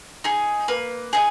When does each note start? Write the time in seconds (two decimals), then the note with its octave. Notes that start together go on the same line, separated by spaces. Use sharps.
0.24 D#4 G#4
0.68 A#3 B4
1.13 D#4 G#4